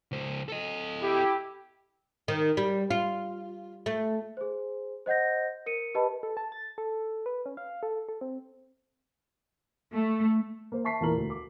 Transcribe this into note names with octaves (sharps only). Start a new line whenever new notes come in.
C#2 C5
A4 D#5
E4 G4
D#3
G3
F4
A3
G#4 C5
C5 D#5 F#5 G6 A#6
A#4 C#7 D#7
G4 B4 D#5 A5 B5
A4
A5
A6
A4
B4
C#4
F5
A4
A4
C4
A3
A#3 C5
E5 A5 C#6 B6 C7
E2 A#2 A#3 E4 A#4 F#7
D2
D6